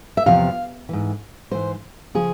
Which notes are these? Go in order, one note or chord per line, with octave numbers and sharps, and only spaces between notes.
E5
E2 C3 F3 F5
G#2 E3
G#2 E3 C5
C#3 F3 G#4